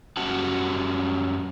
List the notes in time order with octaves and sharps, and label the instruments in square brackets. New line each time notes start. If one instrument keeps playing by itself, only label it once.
[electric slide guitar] F#2 G3 C#4 F#4 F#5 A5